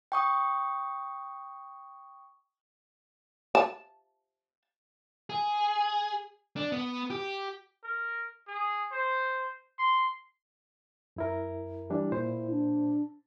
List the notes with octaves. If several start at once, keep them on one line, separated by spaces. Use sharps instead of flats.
G5 C#6 D#6
A5
G#4
D4
B3
G4
A#4
G#4
C5
C6
F#2 E4 A#4
E3 G3 D4 E4
A#2 E4 C5
D4